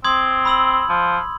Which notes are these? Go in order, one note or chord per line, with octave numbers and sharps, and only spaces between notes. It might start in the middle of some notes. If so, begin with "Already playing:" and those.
C4 C6 D#6 G#6
B5 E6 F#7
F3